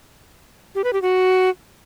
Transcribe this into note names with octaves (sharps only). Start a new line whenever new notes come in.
G4
B4
G4
F#4